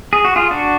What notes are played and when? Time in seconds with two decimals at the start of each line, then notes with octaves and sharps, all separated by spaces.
0.13 G#4
0.25 F#4
0.36 F4 G#4
0.51 D4 F#4